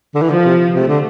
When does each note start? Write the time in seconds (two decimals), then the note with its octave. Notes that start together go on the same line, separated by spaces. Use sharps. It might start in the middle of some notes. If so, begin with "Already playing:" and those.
0.15 D3
0.22 E3
0.29 D3 F3
0.45 C3
0.76 C3 A3
0.88 D3